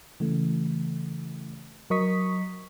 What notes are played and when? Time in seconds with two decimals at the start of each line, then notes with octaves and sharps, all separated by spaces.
0.20 C#3 E3 A3
1.90 F#3 A#4 D#5 C#6 D#6 B6